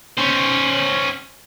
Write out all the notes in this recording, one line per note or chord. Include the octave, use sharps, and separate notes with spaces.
C#4 C5